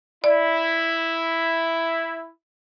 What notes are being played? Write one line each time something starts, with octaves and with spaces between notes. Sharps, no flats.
E4 D5